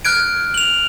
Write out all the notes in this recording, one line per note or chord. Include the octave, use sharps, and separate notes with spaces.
F6 F#6 G#6 D7
F7 F#7